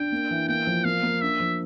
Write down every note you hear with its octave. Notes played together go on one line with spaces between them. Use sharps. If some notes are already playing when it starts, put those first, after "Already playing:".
Already playing: D4 G5
A#3
E3
A#3 G5
F3
A#3 F5
A#3
D4 E5
F3